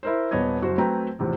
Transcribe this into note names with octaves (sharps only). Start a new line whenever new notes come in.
E4 A#4 C5
D#1 B3 C#5 D#5 G#6
F#1 F#4 C5
F#3 A3 C4 B4 G5 A#5
E2 A2 C3 F3